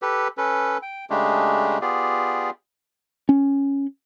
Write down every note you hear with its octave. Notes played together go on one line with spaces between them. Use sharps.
G4 A4 B4
C#4 A4 B4
G5
C#3 G#3 A3 D4 G4
B3 F4 G4 G#4 D5
C#4